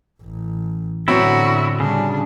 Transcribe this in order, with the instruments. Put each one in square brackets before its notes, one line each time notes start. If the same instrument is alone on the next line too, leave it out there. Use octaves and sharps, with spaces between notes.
[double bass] A1
[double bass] A2 D3 [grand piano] F#3 B3 C4 [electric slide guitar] E4 [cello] F#4
[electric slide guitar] C#3 [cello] G3 D4